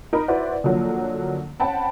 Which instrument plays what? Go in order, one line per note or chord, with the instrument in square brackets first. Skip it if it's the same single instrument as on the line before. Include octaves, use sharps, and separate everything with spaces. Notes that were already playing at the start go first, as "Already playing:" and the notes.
[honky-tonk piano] D#4 A#4 B5
E4 F#4 B4 C5 D5
D3 F3 F#3 A#3
C#4 C5 F#5 G5 A5 B5